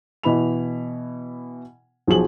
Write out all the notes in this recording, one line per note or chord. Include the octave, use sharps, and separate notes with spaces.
B2 E3 B5 F7
B1 F3 F#4 G#4 F#7